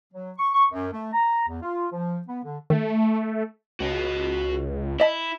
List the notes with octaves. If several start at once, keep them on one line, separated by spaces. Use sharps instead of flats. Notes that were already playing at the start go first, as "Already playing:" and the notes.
F#3
C#6
C#6
F#2
A3
A#5
E2
F4
F3
B3
D3
D#3 A3
C#2 F#4 D#5
E4 D5 D#5 A5